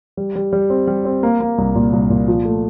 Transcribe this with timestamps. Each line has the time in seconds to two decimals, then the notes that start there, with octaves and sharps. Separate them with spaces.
0.17 G3
0.36 G3
0.53 G3
0.70 C4
0.87 G3
1.05 C4
1.23 A#3
1.40 A#3
1.58 C2
1.75 A#2
1.93 C2
2.10 A#2
2.28 F3
2.45 A3